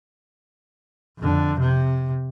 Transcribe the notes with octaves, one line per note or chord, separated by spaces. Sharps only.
F2 D3
C3